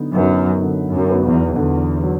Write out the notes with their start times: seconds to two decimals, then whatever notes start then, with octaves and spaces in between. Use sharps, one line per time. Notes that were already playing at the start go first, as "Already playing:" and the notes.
Already playing: D3 F#3 B3 D#4
0.15 F#2 F#3 B3 D#4
0.62 D3
0.94 F#2
1.10 F#3 B3 D#4
1.25 E2
1.56 E2 D3
2.03 F#3